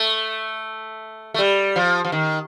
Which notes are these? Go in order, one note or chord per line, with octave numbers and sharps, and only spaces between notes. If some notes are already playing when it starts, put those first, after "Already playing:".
Already playing: A3
A3
G3
F3
F3
D#3